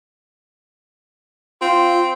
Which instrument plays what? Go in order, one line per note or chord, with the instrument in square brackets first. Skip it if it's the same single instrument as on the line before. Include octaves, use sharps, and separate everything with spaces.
[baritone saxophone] C4 [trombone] F4